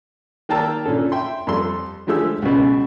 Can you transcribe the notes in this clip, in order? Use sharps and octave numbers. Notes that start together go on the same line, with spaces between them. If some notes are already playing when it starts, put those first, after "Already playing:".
D#3 A#3 G5 A5 A#5 E6
A#2 D3 C#4 A4
E5 G5 C6
F2 G3 A4 C6
D3 F3 G#3 A3 G4 E6
C#2 F#2 B2